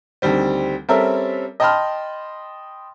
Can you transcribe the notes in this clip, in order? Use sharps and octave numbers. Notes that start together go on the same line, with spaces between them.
D2 D#3 G3 C4
G3 C4 C#4 A4 A#4 E5
D#5 G5 A5 B5 C6 F6